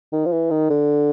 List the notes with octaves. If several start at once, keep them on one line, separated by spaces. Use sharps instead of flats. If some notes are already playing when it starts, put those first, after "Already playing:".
D#3
F3
E3
D#3
D3